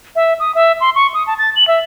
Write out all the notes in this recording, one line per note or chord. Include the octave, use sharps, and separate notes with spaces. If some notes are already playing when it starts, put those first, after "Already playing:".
E5
D#6
E5
C6
C#6
D#6
A5
A6
F#7
E5